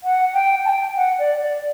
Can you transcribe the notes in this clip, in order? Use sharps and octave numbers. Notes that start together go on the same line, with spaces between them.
F#5
G5
A5
G5
F#5
D5
D5